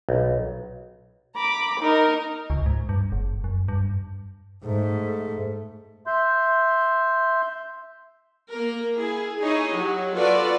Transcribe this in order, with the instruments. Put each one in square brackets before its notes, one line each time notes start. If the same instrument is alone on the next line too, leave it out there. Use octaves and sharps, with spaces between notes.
[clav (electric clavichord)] B1
[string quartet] A#5 B5 D6
D#4 A#4 D#5
[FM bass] C#2
G#2
G2
F#1
F#2
G2
[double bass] G#2 A3
[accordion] E5 C6 G6
[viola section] A#3 A#4
E4 G#4
D#4 E4 G#4 C#5 D#5
F#3 G4
F4 F#4 A4 B4 D5